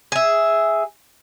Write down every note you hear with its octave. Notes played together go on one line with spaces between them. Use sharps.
G#4 E5